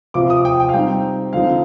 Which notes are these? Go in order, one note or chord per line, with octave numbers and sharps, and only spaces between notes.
C3 F3 C4 F4 D6
D#6
G5
G5
F5
G3 C4 D#4 G5
D3 F3 C4 D#4 F5